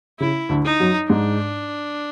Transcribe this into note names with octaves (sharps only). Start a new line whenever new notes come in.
C#3 E4
D2 D3
D#4
F#2 F#3
G#2 G#3 D4